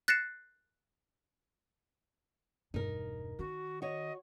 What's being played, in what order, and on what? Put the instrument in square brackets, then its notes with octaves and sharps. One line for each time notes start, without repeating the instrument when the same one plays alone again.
[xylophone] F#6 A6 A#6 C7 C#7 E7
[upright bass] E1 G2 [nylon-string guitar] D#4 A#4
[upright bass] D#3 [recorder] F#4
[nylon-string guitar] F#4 C#5 [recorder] D#5